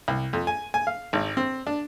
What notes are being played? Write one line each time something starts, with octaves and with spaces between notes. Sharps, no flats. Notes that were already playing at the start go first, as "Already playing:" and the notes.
C2
F2
G#5
G#5
F5
G#1
C4
D4